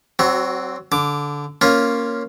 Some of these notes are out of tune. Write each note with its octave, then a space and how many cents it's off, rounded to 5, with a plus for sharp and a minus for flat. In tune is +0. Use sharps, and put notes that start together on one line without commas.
F#3 +30 C4 +0 F#4 +0
D3 -15 D6 +5
A#3 +0 C#4 +0 F4 +0